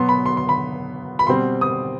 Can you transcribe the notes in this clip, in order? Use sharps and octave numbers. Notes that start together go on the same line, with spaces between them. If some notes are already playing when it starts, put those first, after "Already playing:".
Already playing: B2 F#3 B3 C6
B5
C6
C6
B5
B5
B2 G3 C4 C6
D#6